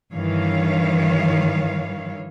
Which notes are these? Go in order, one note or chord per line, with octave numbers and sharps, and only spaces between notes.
G2 D#3 E3 C#5 F5